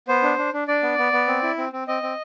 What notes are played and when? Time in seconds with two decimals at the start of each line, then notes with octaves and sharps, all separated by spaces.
0.08 B3 C5
0.23 D4
0.38 D4
0.53 D4
0.68 D4 D5
0.83 B3
0.98 B3
1.13 B3
1.27 C4
1.43 E4
1.58 C4
1.73 C4
1.88 C4 D#5
2.02 C4